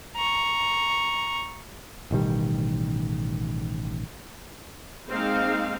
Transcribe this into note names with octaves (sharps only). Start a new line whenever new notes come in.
A#5 C#6
A1 B2 D#3 G3
G#3 A#3 C4 D#4 F5